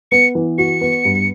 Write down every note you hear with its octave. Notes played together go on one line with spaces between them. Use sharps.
B3 C#7
E3
F#4 C#7
B3
G2